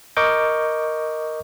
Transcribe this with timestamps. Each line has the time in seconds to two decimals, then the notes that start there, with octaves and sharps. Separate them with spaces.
0.17 A#4 D#5 C#6 D6 G6